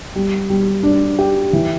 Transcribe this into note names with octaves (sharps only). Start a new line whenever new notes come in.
G3
G3
D4
G4
E3